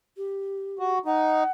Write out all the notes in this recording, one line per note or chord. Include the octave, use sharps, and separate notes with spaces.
G4
F#4
D#4 F#5